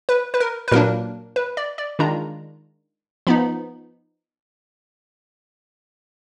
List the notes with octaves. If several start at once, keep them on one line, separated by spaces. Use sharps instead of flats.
B4
B4
A#4
B4
A#2 F#3 A#3 D4 A#4
B4
D5
D5
D#3 G#3 D4 F4 A#5
F3 B3 D#4 B5